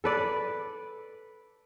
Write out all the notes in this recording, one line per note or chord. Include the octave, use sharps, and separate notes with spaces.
A4 B4 D5